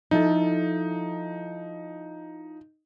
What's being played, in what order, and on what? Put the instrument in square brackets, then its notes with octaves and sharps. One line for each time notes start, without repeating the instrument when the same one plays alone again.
[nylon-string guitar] F3 E4 A4 [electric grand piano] D#4